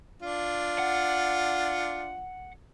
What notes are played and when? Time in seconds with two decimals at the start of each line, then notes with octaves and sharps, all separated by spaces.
0.22 D4 F4
0.79 F#5